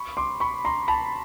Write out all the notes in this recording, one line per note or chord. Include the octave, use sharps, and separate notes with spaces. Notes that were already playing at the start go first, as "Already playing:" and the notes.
Already playing: B5 C#6
C6 D6
B5 C#6
A#5 C6
A5 B5